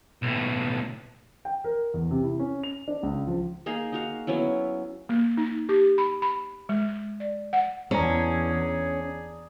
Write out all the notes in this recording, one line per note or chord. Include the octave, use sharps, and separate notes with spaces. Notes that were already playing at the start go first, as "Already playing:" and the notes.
B1 A2
G5
A#4
E2
C3
E4
C#4
F7
D4
C#2
F3
A#3 D#4 G#4 F5
D#4 F#4 F5
F#3 B3 C#4 E4
A#3
D#4
G4
B5
B5
G#3
D5
F#5
E2 C#4 D4 G#4 A#5